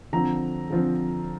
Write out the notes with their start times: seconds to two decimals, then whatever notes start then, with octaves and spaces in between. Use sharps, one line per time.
0.13 D3 F3 C4 A#5
0.70 D3 F3 C4